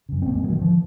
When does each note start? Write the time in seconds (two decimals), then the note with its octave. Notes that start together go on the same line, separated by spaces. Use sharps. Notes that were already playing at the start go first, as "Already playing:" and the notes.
0.09 F#2 C#3
0.22 C4
0.26 A#1 A#3
0.35 G#3
0.43 G#2 F#3
0.53 D#3
0.61 F3